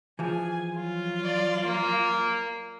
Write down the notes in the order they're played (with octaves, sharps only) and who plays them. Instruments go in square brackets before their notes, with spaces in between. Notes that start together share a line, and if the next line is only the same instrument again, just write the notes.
[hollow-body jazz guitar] E3 F3 [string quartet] G#4 G#5
[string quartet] F#3 F4
[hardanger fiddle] D5
A#3